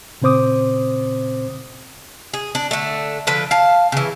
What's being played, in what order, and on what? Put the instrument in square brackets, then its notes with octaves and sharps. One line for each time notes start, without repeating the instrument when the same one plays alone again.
[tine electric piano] A#2 C#3 C4 C5 D6 D#6
[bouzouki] G#4
D4
D3 A3
D3 F3 B4
F5 A5
C#3 E3